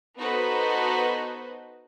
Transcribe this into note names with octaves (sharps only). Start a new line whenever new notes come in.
B3 D#4 F#4 A4 B4 C5